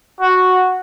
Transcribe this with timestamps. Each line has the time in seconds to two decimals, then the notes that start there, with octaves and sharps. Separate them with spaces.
0.21 F#4